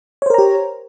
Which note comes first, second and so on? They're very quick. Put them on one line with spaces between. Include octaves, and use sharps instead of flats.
C#5 C5 A#4 A#5 G4